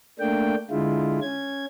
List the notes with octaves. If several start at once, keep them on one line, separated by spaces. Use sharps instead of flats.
A3 A#3 D4 G5
D3 G#3 E4 F4
C#4 G#6